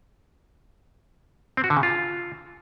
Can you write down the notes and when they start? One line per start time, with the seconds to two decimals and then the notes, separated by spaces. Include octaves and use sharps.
1.57 C4
1.64 F#4
1.70 D3
1.77 C#3
1.83 F4